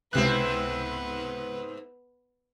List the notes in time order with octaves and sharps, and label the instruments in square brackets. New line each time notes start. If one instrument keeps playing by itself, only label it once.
[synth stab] C#2 C3 F#6 [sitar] G#2 C4 E4 [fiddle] B3 B4